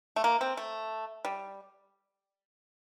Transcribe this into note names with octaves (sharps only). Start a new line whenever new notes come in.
A3
A#3
C4
A3
G3